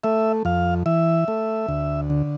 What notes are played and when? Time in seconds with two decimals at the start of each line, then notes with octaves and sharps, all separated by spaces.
0.04 A3 E5
0.45 F2 F5
0.86 E3 E5
1.28 A3
1.69 D2
2.10 D3